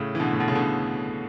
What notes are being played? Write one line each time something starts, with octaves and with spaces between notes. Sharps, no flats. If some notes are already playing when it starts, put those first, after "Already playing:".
Already playing: A2 C#3
E3
B2 D3
A2
B2
C#3
B2 D3